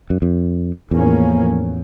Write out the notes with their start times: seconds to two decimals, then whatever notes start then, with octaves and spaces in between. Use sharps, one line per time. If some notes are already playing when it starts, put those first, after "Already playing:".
0.10 F#2
0.22 F2
0.91 E2 A2 F3 A#3 C#4